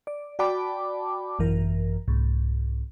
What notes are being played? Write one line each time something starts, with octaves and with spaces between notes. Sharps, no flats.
D5
F#4 D5 G5 A5 B5 D6
G#1 F#2 E3 A#4
C2 G#2